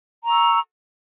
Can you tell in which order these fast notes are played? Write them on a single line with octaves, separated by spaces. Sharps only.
A#5 C#6 E6